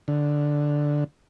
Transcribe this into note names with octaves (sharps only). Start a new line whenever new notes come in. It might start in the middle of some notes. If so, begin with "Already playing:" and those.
D3